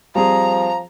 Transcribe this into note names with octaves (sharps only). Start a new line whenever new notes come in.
F3 G3 C4 G#4 A#5